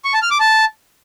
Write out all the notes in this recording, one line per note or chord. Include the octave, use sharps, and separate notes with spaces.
C#6
A5
F6
D6
A5